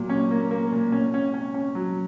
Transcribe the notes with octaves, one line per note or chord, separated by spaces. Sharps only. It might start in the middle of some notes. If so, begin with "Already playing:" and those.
Already playing: A#2 F#3
C#4
A#3
A#3
A#2
C#4
C#4
C#4
C#4
F#3